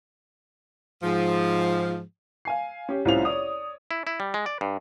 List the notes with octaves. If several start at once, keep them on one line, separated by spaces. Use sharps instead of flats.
G#2 F3
F5 G#5 C7
C#4 G4
C2 A2 C#4 F4 C5 F7
C#5 D5 D#6
E4
E4
G3
G#3
D5
G2